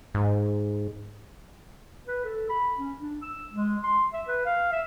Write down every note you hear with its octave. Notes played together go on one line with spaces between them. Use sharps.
G#2
B4
A4
B5
C#4
D4
E6
G#3
C6
E5
B4
F5
E5